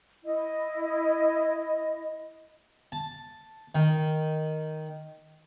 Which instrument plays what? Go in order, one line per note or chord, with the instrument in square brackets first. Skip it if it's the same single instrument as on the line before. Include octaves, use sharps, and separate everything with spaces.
[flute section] E4 D#5
[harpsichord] A5
D#3